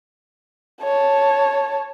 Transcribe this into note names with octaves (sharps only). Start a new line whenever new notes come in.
C#5 A5